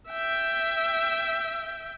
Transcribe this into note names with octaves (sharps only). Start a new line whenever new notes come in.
E5 G5